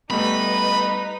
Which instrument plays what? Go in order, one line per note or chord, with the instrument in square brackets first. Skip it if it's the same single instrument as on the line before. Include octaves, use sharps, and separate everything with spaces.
[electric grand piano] G3 A3 B3 [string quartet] D#4 B4 [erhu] D#5 [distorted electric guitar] B5